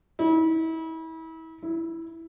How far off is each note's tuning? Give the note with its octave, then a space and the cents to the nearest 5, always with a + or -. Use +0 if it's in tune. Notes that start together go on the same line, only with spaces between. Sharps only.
E4 -35
E4 +5